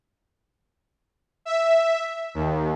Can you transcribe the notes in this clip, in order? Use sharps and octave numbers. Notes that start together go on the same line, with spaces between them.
E5
D#2